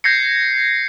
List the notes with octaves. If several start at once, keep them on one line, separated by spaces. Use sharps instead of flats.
G6 G#6 A#6 C7 C#7